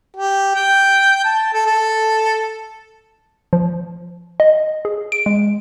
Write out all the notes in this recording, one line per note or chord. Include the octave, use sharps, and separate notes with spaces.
G4
G5
A5
A4
A4
F3
D#5
G#4
D7
G#3